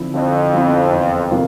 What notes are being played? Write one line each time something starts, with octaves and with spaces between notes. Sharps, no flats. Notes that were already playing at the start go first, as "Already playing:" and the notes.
Already playing: D3 F3 C4 E4
F2 D3
F3 C4 E4
E2
C3 F3 A#3 F4